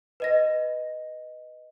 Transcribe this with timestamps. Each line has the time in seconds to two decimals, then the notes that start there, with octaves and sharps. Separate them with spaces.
0.20 B4 D#5 A#6